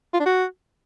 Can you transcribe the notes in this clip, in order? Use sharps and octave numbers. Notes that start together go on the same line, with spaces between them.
F4
D4
F#4